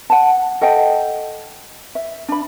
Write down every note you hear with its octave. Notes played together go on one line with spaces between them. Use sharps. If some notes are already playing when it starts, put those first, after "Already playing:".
F#5 A5
A4 D#5 F#5 G5
E5
D4 B5